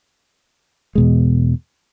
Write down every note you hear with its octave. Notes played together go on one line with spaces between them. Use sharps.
E2 B2 G#3